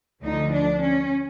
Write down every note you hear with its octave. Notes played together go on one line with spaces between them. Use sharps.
D2 D3 F3 D#4
D4
C#4